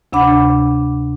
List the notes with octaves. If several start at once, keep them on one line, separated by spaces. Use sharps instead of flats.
D2 C3 D4 F#5 B5 D6